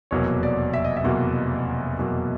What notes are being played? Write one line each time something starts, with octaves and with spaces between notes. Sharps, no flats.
F1 E2 B2 F#3 A#3 C#5
D5
E5
D#5
E5
F1 E2 B2 F#3 A#3
F1 E2 B2 F#3 A#3